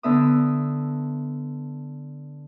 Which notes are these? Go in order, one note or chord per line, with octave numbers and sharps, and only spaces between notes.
D3 B3 E5 D#6